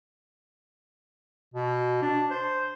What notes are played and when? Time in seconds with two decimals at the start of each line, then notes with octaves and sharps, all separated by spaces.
1.54 B2
2.02 D4
2.31 C5